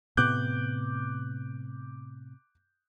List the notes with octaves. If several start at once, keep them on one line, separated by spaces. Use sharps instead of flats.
A2 C3 B3 D6 F#6 G6